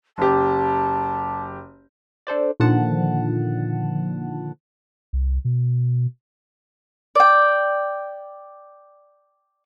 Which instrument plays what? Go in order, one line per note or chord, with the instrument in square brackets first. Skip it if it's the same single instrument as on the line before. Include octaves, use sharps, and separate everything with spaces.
[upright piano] F#1 G4 [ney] A5
[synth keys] D4 A4 C5 D5
A#2 D3 D#3 F3 F#5 A5
[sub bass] C2
B2
[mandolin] D5 G5